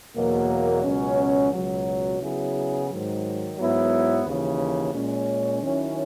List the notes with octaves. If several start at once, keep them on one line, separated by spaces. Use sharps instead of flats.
E2 B2 F#3 A#3
C#2 B2 F#3 C#4
C#2 B2 F#3
C#3 F#3 B3 E4 G#4
G#2 D#3 F#3
G#2 F#3 B3 E4
D#2 C#3 E3
A#2 G#3 C#4
D#3 F#3 C#4 E4